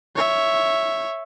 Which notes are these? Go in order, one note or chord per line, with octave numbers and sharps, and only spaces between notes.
C#5 E5